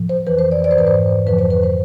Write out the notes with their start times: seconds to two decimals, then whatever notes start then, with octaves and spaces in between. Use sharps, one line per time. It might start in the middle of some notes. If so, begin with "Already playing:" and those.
Already playing: A2 F3
0.09 C5
0.27 F2 E3 B4
0.38 C5
0.52 D5
0.64 D5
0.71 C5
0.77 G#2 E3 B4
0.87 C5
1.26 F2 D3 F3 B4
1.39 C5
1.50 B4
1.63 C5